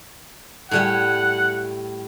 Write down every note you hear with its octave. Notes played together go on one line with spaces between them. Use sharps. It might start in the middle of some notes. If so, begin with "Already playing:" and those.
A2 G3 F#5 G#5